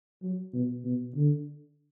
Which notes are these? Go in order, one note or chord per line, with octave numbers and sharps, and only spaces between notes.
F#3
B2
B2
D3